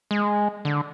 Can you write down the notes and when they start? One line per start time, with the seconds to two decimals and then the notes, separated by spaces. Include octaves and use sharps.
0.11 G#3
0.65 D3